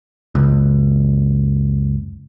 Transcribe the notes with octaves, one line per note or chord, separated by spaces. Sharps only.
F#1 C#2